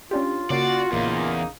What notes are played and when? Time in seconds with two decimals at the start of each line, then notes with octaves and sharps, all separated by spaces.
0.11 C#4 D4 F4 G4
0.50 C#3 A#3 F#4 D5 C7
0.92 A#1 E2 C#3 A#3 D#4